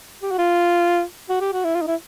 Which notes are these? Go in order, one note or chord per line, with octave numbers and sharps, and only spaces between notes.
G4
F#4
F4
F#4
G4
F#4
E4
F4
D#4
E4